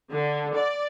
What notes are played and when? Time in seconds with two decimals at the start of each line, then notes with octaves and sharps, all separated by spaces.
0.12 D3
0.55 D5